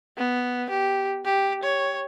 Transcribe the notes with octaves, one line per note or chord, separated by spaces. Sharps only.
B3
G4
G4
C#5